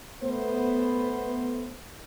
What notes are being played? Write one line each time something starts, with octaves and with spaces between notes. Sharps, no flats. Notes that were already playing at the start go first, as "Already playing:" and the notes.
A3 B3 C5